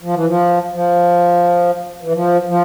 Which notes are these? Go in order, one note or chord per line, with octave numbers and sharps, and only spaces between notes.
F3
E3
F3
F3
E3
F3
F3